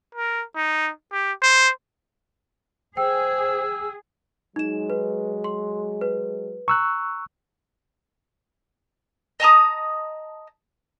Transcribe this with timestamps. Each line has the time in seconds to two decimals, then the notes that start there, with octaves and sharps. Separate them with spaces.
0.15 A#4
0.56 D#4
1.12 G4
1.42 C5
2.97 G#4 C5 G5 E6
4.56 F#3 G#3 D#4 E7
4.90 B4
5.44 C6
6.01 B4
6.68 A#5 C#6 E6 F#6
9.40 D#5 A5 A#5 D#6